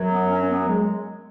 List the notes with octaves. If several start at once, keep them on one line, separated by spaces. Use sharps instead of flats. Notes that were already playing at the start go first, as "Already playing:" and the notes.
Already playing: F#2 F#3
B3
C#4
C#4
B3
G#3